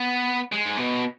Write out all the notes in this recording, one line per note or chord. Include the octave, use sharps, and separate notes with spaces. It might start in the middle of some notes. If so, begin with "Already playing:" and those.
Already playing: B3
G#3
G#2
B2